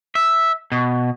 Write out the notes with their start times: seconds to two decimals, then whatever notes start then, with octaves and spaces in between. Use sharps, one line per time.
0.15 E5
0.72 B2